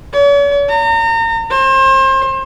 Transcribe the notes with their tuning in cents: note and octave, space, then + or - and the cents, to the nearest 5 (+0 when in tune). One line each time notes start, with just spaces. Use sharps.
C#5 +45
A#5 -35
C5 +35